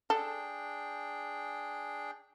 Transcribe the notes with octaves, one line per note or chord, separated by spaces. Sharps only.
D4 G#4 A4 G5